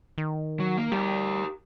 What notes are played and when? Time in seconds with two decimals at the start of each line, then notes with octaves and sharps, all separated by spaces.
0.18 D#3
0.60 F#3
0.78 A#3
0.92 G3 G4 A#4